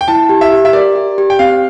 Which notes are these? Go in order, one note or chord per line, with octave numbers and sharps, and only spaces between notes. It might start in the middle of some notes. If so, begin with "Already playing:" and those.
G5
E4 A5
G4
E5
G4
E5
A#4 D5
G4
G4
G5
C4 F5